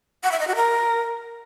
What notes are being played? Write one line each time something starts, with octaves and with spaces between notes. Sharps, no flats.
F#5
E5
D#5
F#4
A#4